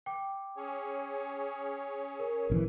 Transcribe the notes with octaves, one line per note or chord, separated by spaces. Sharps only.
G5 D6
C#4 G#4 C#5
A#4
A#1 C#3 E3